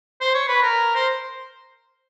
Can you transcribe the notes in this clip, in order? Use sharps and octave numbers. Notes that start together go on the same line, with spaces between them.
C5
C#5
B4
A#4
C5